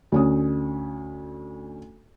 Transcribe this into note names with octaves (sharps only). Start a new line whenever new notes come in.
D2 C#4 D#6